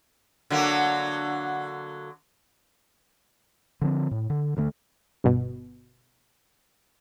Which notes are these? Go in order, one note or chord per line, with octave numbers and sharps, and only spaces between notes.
D3 F#3 A#3
D3 F3 C4
A2
D3
D2 D3 A3
G1 B2